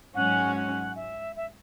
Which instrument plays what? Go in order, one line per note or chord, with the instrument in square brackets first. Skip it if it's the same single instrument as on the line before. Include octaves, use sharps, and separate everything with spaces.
[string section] G#2 F#3 C#4 [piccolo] F#5
[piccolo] F#5
E5
E5